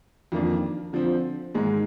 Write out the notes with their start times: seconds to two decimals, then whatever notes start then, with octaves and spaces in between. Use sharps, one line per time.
0.32 F2 D#3 A#3 D4
0.93 D3 F3 C4
1.54 G#2 D#3 G#3